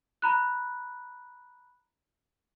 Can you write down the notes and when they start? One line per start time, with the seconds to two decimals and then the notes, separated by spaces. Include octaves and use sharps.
0.22 A#5 B5 F#6